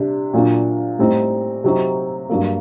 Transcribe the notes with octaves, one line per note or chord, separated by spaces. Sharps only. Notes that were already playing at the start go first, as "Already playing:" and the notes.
Already playing: C3 G3 D4
A#2 F#3 A#3 D4
A2 G3 C4 D#4
C3 F#3 C4 D#4
G2 F#3 A#3